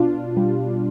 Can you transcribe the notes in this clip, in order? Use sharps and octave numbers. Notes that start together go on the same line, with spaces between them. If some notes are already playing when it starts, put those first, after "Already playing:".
Already playing: B2 D4 F4
G3